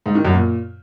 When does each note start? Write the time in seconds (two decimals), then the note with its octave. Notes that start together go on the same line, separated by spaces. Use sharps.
0.06 G#2
0.15 D#3
0.25 F#2
0.34 A#2